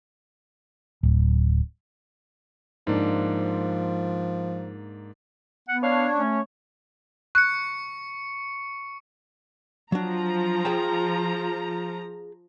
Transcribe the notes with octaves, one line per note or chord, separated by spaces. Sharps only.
D1
G#2 F3 A#3 D4
B3 F#5
D4 C#5 F5
A3 C#4
C#6 F#6 C#7
F3 F#3 D4 A#5
G#4 G5 A5